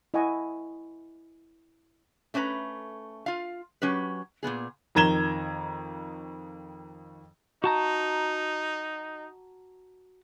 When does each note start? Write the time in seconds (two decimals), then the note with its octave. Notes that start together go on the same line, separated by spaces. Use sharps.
0.14 E4 D#5 F#5 G#5 C#6
2.34 A3 C#4 D4 B4 A#5
3.26 F4 F5
3.82 F#3 C#4 G4 B4
4.43 A#2 D#3 B3 G#4
4.95 F2 D#3 A#5 G#6 E7 G7
7.64 D#4 F#4 A5 A#5